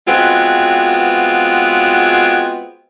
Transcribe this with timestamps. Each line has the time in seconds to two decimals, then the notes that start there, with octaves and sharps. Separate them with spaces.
0.07 G#3 B3 C4 F4 F#4